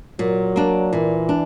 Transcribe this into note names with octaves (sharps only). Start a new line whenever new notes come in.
A#2 F#3
A#3 D4
A#2 E3
D4